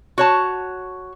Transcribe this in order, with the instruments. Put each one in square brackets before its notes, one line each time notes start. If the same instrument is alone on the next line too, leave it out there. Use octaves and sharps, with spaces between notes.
[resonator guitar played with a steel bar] F#4 C#5 A5